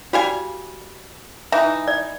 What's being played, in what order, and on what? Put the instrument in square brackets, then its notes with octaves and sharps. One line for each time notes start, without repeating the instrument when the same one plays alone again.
[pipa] G3 F5 G#5 [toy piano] F#4
[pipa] E3 D#4 [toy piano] E5
[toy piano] D5